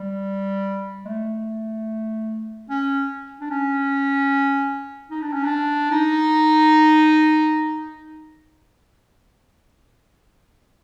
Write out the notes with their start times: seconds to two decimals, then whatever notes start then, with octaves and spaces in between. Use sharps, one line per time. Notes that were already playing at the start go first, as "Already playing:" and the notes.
Already playing: G3
1.05 G#3
1.09 A3
2.70 C#4
3.41 D4
3.50 C#4
5.10 D#4
5.22 D4
5.33 C#4
5.45 D4
5.91 D#4